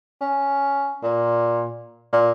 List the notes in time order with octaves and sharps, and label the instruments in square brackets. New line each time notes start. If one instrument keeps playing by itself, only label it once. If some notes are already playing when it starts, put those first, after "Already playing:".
[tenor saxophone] C#4
A#2
A#2